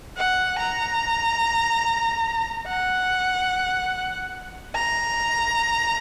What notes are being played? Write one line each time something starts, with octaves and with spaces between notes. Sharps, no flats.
F#5
A#5
F#5
A#5